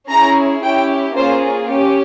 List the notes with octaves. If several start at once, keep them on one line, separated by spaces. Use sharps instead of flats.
C#4 E4 G#4 A#5
C#4 E4 G4 G5
A#3 C#4 F4 G#4 C5
C#4 G4